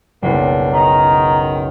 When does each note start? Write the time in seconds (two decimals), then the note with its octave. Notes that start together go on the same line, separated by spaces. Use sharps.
0.22 F#1 B1 G3 A#3 D4
0.73 D#3 A#5